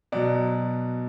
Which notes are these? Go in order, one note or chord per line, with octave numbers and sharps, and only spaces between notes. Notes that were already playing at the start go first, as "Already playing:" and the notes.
B2 F#3 D5